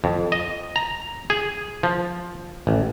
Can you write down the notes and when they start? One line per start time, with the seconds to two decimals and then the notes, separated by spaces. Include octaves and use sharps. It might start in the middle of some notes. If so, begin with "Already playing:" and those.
0.04 F2
0.32 D#5
0.76 A#5
1.30 G#4
1.83 F3
2.67 A1